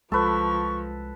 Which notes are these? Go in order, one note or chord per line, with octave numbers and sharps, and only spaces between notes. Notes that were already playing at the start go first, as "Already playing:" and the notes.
C2 F3 G#3 A4 B4 C#6